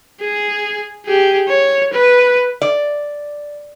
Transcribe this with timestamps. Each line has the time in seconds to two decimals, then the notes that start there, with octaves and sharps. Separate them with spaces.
0.21 G#4
1.06 G4 G#4
1.48 C#5
1.93 B4
2.62 D5